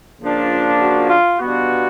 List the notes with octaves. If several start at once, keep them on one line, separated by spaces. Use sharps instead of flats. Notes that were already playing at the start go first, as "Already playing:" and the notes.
C#3 F3 A#3 D4 F4
F#4
F4
B2 G3 B3 D4 F4 F#4